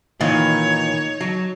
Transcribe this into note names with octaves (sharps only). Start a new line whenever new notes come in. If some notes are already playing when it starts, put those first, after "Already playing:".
A#2 D#3 E3 D#4 C#5
F#3